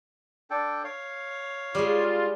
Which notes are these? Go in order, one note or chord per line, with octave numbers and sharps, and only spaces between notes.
D4 A4 G5
C#5 F5
G3 G#3 F4